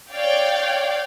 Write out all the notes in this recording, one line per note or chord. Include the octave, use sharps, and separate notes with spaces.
C#5 D5 F5 G5